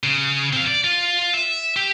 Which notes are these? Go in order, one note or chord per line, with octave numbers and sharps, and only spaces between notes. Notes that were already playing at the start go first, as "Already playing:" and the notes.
C#3
C4 F5
D5
F4
E5
G4